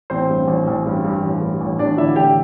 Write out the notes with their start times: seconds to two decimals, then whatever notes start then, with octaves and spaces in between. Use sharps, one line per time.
0.10 A1 C4 C5
0.30 G2
0.47 A1
0.67 A1
0.86 G2
1.04 G2
1.23 A1
1.41 G2
1.61 A1
1.79 A1 D4 D5
1.97 D3 E4 E5
2.16 A1 G4 G5